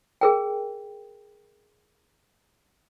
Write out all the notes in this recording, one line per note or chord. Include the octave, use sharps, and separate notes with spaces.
G#4 A#4 G5